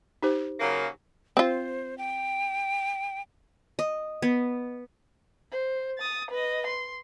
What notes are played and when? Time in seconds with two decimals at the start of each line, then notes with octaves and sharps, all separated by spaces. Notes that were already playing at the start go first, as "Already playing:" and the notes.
0.23 D#4 G4 C5
0.60 C#3 F#3 A#3
1.37 C4 F4 C5
1.98 G5
3.79 D#5
4.22 B3
5.52 C5
5.99 D#6 A6
6.31 B4 D#5
6.67 C6